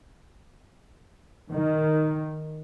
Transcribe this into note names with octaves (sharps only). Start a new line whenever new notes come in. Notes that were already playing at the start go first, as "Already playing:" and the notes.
D#3